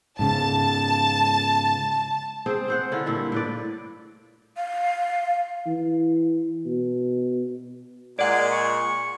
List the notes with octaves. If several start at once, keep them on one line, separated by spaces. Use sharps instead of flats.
G#2 C#3 A5
C4 G#4 C5
C4 C5 F#5
D3 E4 F4 C#5
G2 A#2 E4 F4
A2 B4 D5
F5
E3
B2
A#2 G#3 G#4 D5 F#5
C#6